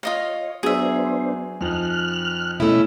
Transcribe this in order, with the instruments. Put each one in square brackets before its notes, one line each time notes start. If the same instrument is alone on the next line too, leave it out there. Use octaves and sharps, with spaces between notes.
[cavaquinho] F4 D#5 F5 [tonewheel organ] C#5
[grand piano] F#3 [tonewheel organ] B3 D4 C5 [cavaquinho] G#4 E5
[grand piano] F2 F3 D#4 [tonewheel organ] F6 F#6
[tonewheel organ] B2 D#5 [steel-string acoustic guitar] A3 C#4 E4